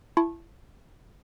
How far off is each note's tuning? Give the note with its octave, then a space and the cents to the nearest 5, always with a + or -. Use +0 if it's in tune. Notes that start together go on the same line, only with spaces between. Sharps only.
E4 +25 A5 -15 C#6 -30